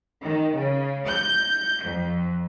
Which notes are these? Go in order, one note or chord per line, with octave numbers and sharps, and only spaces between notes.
D#3
C#3
G6
F2